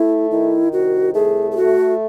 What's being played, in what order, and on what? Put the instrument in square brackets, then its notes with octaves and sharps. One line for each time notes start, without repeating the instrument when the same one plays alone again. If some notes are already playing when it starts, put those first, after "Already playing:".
Already playing: [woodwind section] A3 [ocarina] E4
[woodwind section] D#3 [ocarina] E4
[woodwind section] C2 [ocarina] F#4
[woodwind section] A3 [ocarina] G#4
[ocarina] G#4
[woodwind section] A3 [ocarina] F#4